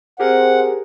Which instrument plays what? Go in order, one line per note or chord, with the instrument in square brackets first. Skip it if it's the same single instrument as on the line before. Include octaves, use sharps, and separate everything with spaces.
[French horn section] C4 C5 [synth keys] G4 G#4 A#4 [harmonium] F#5